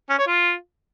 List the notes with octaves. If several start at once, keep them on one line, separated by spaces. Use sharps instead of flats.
C#4
C#5
F4